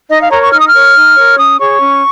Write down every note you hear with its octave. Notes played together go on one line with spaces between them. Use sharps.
D#4 D#5
F5
A#4 C#5 A#5
C#6
D#4 F6
D#6
F6
A#4 C#5
D#4
A#4 C#5
C#4 D#6
G#4 C#5 C#6
C#4